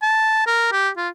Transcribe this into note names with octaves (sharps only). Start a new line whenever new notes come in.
A5
A#4
G4
F4